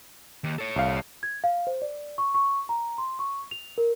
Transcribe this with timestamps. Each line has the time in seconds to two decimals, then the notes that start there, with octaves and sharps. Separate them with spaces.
0.44 D#2
0.58 A4 C#5
0.76 C2 F5
1.23 G#6
1.44 F5
1.67 C5
1.82 D5
2.18 C#6
2.35 C#6
2.69 A#5
2.98 C6
3.19 C#6
3.51 F7
3.78 A#4